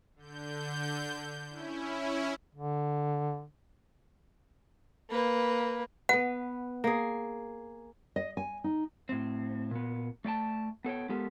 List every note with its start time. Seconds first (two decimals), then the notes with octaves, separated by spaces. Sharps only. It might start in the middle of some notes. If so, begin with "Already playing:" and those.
0.16 D3 G6
1.49 C#4 E4
2.55 D3
5.11 A#3 B4
6.09 B3 B4 F#5
6.84 A#3 G#4
8.16 D#5
8.37 G#5
8.64 D#4
9.09 A2 C4
9.71 A#2 B3
10.25 A3 D5 G5 A5
10.84 B3 A4 C#5 G5
11.09 G#3 B3 G4 A4 A#4